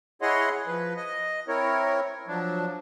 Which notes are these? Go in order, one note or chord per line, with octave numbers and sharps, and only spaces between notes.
E4 G#4 C#5 D#5 F#5 C6
F3 B4
D#5
C4 E4 A#4 C#5
F3 F#3 D4